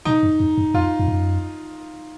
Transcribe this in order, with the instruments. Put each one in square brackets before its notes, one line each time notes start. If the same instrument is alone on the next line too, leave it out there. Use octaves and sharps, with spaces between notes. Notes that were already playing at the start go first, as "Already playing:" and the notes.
[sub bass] B2 [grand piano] D#4
[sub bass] F#2
F2
F#2
[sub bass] F2 [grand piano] F4
[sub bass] F2
F#2